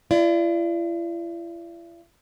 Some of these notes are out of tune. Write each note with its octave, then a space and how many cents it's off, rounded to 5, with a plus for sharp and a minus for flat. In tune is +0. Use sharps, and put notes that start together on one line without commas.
E4 +45 D5 +0